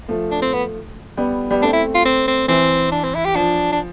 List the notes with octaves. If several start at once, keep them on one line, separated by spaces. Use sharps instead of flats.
F3 A3
D4
C4
B3
G3 B3
G3 B3
A3 C4 D4
E4
F4
C4
C4
E3 C4
D4
C4
E4
G4
F3 D4
D4